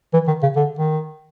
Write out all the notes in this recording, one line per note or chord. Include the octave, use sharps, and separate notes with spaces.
E3
D#3
C#3
D3
D#3